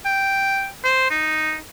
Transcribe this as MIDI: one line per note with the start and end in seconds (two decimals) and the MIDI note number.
0.06 0.68 79
0.85 1.09 72
1.11 1.57 63